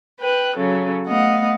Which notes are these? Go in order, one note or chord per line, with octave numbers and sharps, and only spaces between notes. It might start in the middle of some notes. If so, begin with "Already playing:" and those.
B4 G5 F#6
C#3 F#3 A4
A3 B3 D#5 F5 F#5